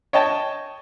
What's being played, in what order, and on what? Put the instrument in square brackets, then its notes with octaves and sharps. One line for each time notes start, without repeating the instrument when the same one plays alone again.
[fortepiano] C#5 D#5 G5 A5